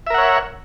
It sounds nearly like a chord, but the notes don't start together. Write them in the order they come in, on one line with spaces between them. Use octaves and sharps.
E5 A#4 F#5 C#5